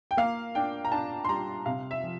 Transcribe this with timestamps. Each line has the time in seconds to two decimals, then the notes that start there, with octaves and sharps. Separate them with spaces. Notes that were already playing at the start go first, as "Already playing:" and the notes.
0.11 G5
0.17 A#3 F5
0.55 D4 G5
0.85 A#5
0.92 D4 A5
1.24 C6
1.29 G3 A#5
1.66 C3 F5
1.91 E5
2.03 F3